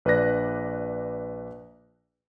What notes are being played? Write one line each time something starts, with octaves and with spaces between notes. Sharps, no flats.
A#1 B4 D5 F#6 A#6